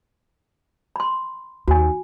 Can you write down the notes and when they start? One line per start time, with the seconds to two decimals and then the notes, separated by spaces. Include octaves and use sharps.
0.96 B5 C6
1.68 D#2 F#4 G#5